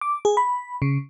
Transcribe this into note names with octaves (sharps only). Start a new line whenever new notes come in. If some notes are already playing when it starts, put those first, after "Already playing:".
D6
G#4
B5
C#3